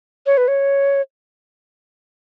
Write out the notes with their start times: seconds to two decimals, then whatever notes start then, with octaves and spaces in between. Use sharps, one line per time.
0.26 C#5
0.37 B4
0.48 C#5